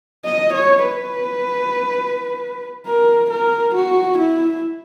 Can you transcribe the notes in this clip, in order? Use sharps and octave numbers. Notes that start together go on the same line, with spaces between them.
D#5
C#5
B4
A#4
A#4
F#4
E4